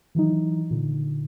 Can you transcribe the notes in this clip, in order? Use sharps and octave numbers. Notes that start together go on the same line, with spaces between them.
D#3 E3 F#3 D#4
A#2 D3